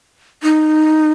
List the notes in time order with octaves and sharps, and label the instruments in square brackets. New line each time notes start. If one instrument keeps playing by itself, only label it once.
[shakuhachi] D#4